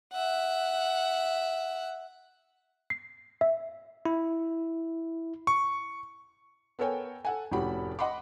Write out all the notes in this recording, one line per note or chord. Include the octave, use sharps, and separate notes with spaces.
E5 F#5
C7
E5
E4
C#6
B3 A4 A#4 C#5 G5 G#5
A4 F#5 G#5
F1 A2 C#4 F#4 G4 B5
D#5 F#5 B5 C6 D6